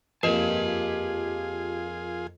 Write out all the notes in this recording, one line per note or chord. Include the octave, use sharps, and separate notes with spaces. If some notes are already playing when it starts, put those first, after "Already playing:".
F2 A#3 F4 G4 G#4 B4 D#5 A5